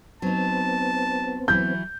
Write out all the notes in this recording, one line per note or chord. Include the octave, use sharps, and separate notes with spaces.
F#3 B3 C4 D#4 A5
E3 F#3 E4 G6